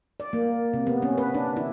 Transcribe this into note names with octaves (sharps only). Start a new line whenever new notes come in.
D5
A#3
C3
B3
C#4
B4
D4
E4